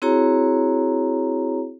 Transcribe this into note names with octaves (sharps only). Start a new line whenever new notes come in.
C4 E4 F#4 G#4 C#5 A#5